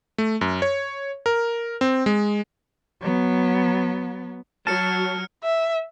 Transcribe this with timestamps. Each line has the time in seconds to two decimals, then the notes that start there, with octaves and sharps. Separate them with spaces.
0.18 A3
0.41 F#2
0.62 C#5
1.26 A#4
1.81 C4
2.06 G#3
3.01 F#3 B3
4.67 F#3 A5 F6 C#7
5.43 E5